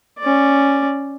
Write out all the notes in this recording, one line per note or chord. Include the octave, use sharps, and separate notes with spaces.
C#4 D5